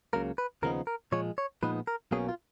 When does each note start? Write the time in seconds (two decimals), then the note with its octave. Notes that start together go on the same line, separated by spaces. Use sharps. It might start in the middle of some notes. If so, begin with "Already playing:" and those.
0.13 C#2 C#3 F#3 A#3 A#4
0.38 B4
0.63 D#2 C#3 F3 B3 D#4 A#4
0.87 A#4
1.12 A#2 F3 G#3 C#5
1.38 C#5
1.63 A#2 F3 G#3 B3 D#4 B4
1.87 A#4
2.11 B1 B2 A#3 C#4 G#4
2.29 F4